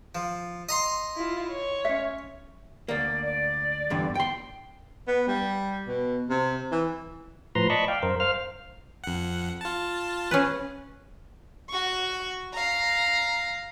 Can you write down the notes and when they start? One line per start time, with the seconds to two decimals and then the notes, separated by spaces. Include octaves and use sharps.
0.15 F3
0.69 D#5 A#5 C6
1.16 E4 F4
1.52 C#5
1.85 C#4 E5
2.88 D2 A#3 D5
3.25 D5
3.90 E2 G2 D3
4.15 G5 C6
5.08 B3
5.28 G3
5.88 B2
6.30 C3
6.72 E3
7.55 A2 F3 B4 A#5 C6
7.70 D5 D#5 A5 B5 C#6
7.88 F5 G5
8.03 F#2 A#4 C5
8.20 C5 F5 F6
9.04 F2 F#5
9.61 F4 A5
10.31 C#4 G#4 B4
11.69 F#4 C#6
12.53 F5 A#5